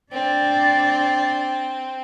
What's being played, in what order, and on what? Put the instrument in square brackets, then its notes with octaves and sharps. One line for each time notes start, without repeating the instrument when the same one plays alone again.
[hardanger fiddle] C4 [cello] D4 D5